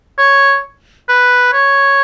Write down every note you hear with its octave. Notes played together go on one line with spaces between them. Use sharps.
C#5
B4
C#5